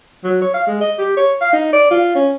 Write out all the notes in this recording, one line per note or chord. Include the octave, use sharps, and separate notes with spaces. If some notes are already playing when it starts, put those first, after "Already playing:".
F#3
C#5
F5
G#3
D#5
G4
C#5
F5
D#4
D5
F4
C#4